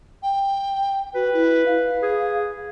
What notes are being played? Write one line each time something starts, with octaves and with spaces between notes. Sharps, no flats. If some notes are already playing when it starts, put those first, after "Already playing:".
G5
F#4 B4
E4
F5
G#4